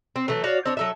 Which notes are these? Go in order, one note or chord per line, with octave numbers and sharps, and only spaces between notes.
C4
E3 F#3 A3
F#4 C#5 D5 F5
C4 D4 C#5
F#3 A4 E5